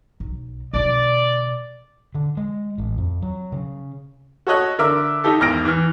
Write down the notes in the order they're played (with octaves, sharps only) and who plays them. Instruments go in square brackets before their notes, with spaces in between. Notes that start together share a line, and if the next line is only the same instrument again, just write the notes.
[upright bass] B1
[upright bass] B2 D3 [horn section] D5
[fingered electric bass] D3
G#3
A1
F2
F#3
C#3
[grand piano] F#4 A4 C#5 D#5 F#6
D3 A#4 E5 D6 E6
D#4 E4 G4 A4
G#1 E2 F6 A#6 D7
E3 F6